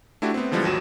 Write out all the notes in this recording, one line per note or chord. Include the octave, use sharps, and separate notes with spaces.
A3 D4 E4 F#4 G4
B3 C4
D3 E3 F3 G3 G#3
G#1 D#2 F#3 F#4 D#7 E7